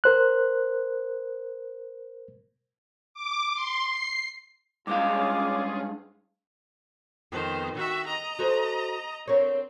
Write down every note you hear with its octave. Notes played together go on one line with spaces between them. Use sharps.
A#4 C5 F#6
D6
C6
C7
G2 G#3 C#4 F4 G#4 F5 D6
F2 D#3 B3 C5
D#3 F#4 E5
D#5 A#5
F#4 A4 C5
C4 A#4 C#5